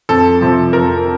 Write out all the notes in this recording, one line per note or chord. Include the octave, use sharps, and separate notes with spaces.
F2 A4
C3 F3
F2 A#4